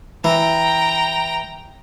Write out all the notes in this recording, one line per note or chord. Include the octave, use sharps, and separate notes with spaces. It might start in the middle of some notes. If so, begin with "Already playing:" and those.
E3 G5 A#5